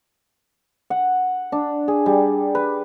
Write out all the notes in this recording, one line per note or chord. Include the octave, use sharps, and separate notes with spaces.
F#5
D4
G#4
G3
B4